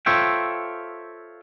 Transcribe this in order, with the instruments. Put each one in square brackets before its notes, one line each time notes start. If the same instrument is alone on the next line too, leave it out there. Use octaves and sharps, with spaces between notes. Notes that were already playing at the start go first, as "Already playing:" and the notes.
[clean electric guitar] F4 A4 C5 C#5 E5 G5